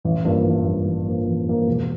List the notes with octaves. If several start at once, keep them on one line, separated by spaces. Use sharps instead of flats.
A1
G2 F3 A#3
A1
G2 F3 A#3
A1
G2 F3 A#3
A1
G2 F3 A#3
E1